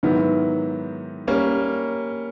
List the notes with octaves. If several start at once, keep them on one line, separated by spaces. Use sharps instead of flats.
G#2 D#3 F#3 B3 E4
G3 A#3 C#4